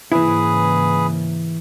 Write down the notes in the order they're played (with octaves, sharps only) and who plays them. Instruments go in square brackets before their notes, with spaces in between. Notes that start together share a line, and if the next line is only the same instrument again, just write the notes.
[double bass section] G#2 C#3 A#3 [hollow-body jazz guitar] E3 E4 [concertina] G#4 B4